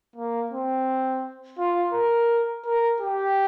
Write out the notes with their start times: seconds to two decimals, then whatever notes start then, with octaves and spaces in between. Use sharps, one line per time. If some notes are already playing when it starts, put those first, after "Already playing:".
0.16 A#3
0.52 C4
1.58 F4
1.93 A#4
2.65 A#4
3.01 G4